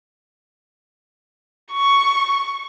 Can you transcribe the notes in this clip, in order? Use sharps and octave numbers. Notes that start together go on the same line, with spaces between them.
C#6